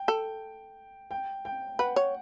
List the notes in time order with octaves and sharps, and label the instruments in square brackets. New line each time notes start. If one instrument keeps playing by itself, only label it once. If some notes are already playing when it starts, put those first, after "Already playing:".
Already playing: [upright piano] G5
[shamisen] A4
[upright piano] G5
G5
[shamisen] B4 [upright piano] F#5
[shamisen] C#5